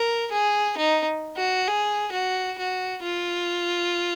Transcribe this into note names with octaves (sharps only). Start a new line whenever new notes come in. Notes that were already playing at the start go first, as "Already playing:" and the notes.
Already playing: A#4
G#4
D#4
F#4
G#4
F#4
F#4
F4